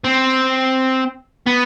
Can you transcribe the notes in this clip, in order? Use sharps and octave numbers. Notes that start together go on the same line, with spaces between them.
C4
B3